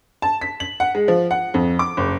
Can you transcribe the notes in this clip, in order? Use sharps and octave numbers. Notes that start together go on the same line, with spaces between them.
A5
B6
F#7
F#5
G#3
F3
F#5
F2
D6
F#1